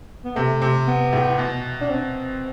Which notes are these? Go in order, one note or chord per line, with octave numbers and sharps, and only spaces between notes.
B3
C3 A3
C3
B3
A2
B2
D4
C4